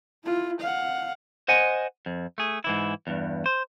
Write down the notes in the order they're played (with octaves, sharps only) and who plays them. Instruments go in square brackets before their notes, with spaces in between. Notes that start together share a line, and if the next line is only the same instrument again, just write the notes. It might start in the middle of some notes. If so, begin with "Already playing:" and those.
[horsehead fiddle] E4 F4
F5 F#5
[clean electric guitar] C5 D#5 F#5 G#5
F2
A3 G#4
G#2 E3 E4
E2 G2
C5